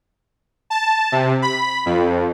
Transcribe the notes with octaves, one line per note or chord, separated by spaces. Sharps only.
A5
C3
B5
F2